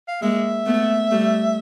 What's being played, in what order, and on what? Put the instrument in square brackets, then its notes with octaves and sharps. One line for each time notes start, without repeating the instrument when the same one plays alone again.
[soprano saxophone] F5
[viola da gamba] G#3 A#3 [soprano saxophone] E5
[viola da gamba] A3 B3
G3 A3